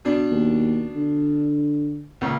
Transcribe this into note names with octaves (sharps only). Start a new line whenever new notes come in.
B2 D4
D#2
D3
C#2 A#2 C#3